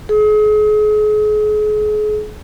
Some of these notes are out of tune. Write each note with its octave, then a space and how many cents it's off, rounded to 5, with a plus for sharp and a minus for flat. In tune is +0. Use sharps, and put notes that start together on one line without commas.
G#4 +35